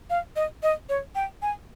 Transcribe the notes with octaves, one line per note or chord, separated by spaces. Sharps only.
F5
D#5
D#5
C#5
G5
G#5